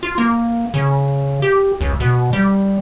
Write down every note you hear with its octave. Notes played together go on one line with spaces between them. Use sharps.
F4
A#3
C#3
G4
C#2
B2
G3